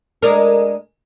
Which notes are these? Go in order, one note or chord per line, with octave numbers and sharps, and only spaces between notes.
G#3 D4 A#4